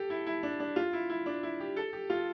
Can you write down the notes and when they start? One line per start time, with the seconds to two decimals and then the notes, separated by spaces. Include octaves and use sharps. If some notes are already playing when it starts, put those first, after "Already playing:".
Already playing: G4 A4
0.10 E4
0.27 E4
0.43 D4
0.60 D4
0.76 F4
0.93 E4
1.10 E4
1.26 D4
1.43 E4
1.60 G4
1.77 A4
1.93 G4
2.10 F4